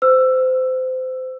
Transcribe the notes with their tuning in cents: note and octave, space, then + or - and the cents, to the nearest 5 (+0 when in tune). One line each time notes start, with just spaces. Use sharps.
C5 -25 E6 +15